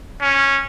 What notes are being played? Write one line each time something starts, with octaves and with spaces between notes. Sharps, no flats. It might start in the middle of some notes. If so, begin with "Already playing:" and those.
C#4